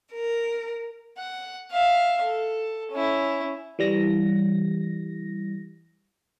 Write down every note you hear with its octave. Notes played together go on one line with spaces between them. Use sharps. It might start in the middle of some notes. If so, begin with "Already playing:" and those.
A#4
F#5
E5 F5
A4
C#4 E4
E3 G3 A#6